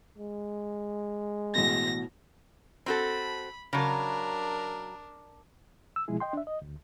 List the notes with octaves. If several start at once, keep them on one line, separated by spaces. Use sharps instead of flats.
G#3
A1 B2 A#6
C4 F#4 A4 B5
C#3 F#3 D4 A#4
E6
B2 F3 G#3 E4 G#4
D#5 G5 C6
D4 E5
D#5
D2